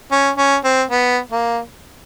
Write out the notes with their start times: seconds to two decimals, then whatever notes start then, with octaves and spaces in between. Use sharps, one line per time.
0.11 C#4
0.37 C#4
0.64 C4
0.90 B3
1.31 A#3